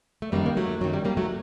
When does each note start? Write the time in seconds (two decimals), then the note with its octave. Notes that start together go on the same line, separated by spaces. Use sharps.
0.22 A3
0.32 F#2 D#3 G3 A#3
0.46 A#3
0.57 F#3 A3
0.81 F#2 D#3 F#3
0.93 G3
1.05 G3 A#3
1.17 F#3 A3